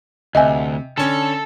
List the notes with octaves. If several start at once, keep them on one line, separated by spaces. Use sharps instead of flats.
D2 C3 D#5 E5 G#5
D3 C#4 A4 A5